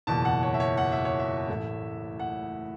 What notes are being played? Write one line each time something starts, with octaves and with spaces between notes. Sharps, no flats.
F#1 E2 B2 A5
F#5
C#5
E5
C#5
F#5
E5
C#5
E5
A1 A2 A3
F#5